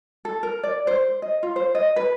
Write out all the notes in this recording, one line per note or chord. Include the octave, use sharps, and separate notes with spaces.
A4
A#4
D5
C5
D#5
F4
C5
D#5
B4